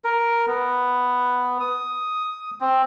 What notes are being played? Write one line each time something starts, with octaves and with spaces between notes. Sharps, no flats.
A#4
B3
D#6
C4